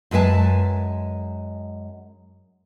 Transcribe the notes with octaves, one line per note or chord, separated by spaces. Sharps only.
F#2 G#3 B4 E5 G#5 A5